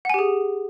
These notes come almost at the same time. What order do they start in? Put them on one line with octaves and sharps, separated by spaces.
F#5 G#5 G4 G#4